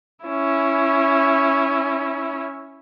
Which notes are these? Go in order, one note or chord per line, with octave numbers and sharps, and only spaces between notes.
C#4 E4